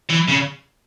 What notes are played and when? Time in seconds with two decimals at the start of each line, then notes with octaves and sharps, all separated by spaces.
0.10 E3
0.29 C#3